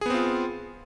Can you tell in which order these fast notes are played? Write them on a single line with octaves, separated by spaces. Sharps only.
G#4 B3 C4 F4